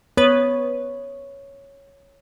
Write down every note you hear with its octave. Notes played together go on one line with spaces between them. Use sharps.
B3 B4 C#5